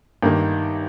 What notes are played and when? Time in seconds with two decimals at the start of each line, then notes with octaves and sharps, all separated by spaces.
0.23 G1 G2 D#3 A#3